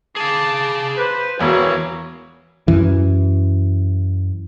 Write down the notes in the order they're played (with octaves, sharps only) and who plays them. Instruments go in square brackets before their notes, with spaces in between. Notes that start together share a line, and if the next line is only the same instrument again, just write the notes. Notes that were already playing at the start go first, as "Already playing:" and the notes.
[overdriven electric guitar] G#4 F5 [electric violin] A5 D6
[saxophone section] B4 [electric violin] C5
[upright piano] E1 [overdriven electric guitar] E3 [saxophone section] A#3 C#5 [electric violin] F#4
[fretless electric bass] F#2 E3